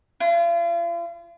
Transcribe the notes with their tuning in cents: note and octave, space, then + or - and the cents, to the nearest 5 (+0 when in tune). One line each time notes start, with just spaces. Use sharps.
F4 -40